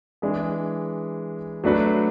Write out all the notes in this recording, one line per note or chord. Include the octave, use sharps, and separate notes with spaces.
E3 G#3 D4 G#4 B4
F#3 A3 D4 F#4 B4